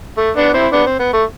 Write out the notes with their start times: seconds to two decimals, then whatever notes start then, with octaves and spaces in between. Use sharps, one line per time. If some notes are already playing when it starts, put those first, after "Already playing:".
0.18 A3
0.37 B3 D4
0.54 C4 E4
0.72 B3 D4
0.87 C4
0.99 B3
1.13 A3